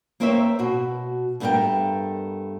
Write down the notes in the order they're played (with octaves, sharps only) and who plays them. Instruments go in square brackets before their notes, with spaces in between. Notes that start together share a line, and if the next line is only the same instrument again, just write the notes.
[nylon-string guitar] A#3 C4 A#4 C5 C#5 E5
B2 F#4
G2 A3 B3 D4 A#4 G5